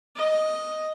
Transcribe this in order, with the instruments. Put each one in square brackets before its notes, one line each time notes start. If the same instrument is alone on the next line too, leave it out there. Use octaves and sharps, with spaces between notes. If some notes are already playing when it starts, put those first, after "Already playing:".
[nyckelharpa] D#5